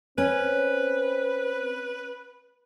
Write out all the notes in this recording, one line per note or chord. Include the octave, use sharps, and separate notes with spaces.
C4 C#4 B4